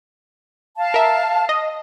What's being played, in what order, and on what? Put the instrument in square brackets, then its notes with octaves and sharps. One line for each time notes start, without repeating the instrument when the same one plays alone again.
[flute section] F5 A5
[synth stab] A#4 E5
D#5